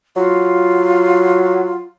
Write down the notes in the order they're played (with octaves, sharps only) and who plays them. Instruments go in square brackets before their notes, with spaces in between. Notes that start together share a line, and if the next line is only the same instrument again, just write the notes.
[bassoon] F#3 [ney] F4